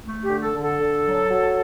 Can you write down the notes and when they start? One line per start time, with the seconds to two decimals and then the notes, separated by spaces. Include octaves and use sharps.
0.04 A3
0.23 G4
0.30 D3
0.43 A4
0.55 D3
0.61 A4
0.80 D3
1.05 F#3
1.31 F#3